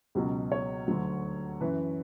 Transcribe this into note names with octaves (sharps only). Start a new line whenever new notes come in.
C#2 B2 F#3
C#5
D2 D3 F#3
F#2 E3 B4